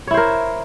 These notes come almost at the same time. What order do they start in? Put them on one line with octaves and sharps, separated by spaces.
C#5 E4 C5 A#4